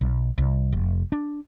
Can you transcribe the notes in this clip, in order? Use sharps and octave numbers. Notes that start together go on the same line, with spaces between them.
B1
C2
F1
D4